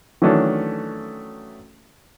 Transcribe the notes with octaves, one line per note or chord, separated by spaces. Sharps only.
D#3 E3 F#3 A3 C#4 D4